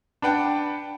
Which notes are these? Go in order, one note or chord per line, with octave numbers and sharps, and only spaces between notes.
D4 B4 F#5 G5 A5